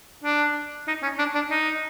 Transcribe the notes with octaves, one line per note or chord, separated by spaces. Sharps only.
D4
D#4
C#4
D4
D4
D#4